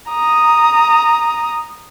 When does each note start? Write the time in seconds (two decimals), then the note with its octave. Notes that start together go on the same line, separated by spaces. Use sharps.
0.10 A#5 D#6